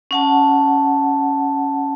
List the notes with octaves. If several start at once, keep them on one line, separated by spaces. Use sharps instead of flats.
C#4 F#5 A5